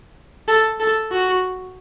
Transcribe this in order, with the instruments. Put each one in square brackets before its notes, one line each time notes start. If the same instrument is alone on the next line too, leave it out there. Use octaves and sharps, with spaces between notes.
[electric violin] A4
A4
F#4